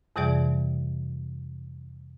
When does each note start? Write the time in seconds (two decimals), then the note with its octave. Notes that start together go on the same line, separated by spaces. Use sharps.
0.16 F2 C3 E3 G3 G#4 D5